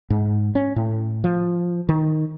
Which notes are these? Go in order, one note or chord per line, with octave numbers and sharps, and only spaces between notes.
G#2
C#4
A2
F3
D#3